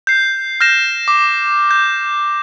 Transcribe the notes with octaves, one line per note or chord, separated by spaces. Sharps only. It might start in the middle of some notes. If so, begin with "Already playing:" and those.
G6 C7
F6 G6 A#6 E7
D6
G6